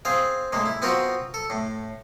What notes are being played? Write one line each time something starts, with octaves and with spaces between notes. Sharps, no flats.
C4 G#4 F5
A2 G#3 A#3
E4
B3 C4 F4 F#4 A#4
A4
A2